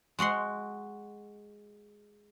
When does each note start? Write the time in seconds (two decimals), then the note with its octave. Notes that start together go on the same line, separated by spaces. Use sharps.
0.19 G#3 F#4 F#5 C6